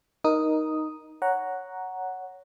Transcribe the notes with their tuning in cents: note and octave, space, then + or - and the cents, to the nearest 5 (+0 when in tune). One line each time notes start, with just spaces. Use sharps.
D#4 +0 A#4 +15 D#6 +0
C#5 +5 F#5 +0 A#5 +0